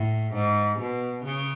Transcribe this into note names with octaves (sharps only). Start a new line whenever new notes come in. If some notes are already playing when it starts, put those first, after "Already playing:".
Already playing: A2
G#2
B2
C#3